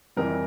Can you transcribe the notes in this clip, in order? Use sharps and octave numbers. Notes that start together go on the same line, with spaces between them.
F2 C3 E3 G3 A#4